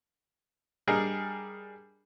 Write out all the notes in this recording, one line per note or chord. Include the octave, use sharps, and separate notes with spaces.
G3 D4 G#4 A#4 D#5